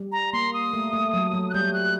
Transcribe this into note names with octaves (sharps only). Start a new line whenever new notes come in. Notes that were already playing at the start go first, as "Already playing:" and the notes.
Already playing: G3
A#5
A#3 C6
D#6
A3
A3
F#3
F#3
F#6
G3 G6
F#6